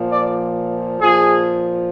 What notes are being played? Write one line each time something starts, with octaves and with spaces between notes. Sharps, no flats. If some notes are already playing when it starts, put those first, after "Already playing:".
Already playing: A#2 F3
D5
A#2 F3 G#4